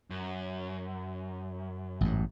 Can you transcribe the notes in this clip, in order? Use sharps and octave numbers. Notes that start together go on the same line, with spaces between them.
F#2
A1 G#2